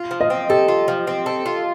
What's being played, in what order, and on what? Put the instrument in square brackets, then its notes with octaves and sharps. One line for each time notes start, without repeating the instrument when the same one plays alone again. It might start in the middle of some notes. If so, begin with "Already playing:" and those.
Already playing: [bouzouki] F4
F3
[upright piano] D#5
[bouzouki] C4
[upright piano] G4 [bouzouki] A4
[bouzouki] F4
F3
C4
A4
F4